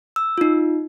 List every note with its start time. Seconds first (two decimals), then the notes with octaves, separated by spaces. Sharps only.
0.16 E6
0.38 D#4 F4